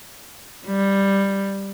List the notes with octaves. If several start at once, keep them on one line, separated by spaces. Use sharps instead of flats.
G3